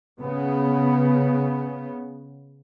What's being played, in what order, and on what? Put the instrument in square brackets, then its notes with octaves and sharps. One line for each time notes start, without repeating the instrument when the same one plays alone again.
[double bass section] C#3 B3